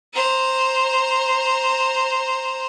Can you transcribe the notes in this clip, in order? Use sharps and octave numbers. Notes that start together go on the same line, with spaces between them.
C5 A#5